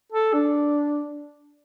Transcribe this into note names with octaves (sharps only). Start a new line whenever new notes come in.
A4
D4